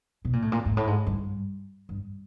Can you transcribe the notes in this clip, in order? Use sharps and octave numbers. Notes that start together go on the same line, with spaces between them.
B2
A#2
A2
A#2
G#2
A2
G#2
G2
G2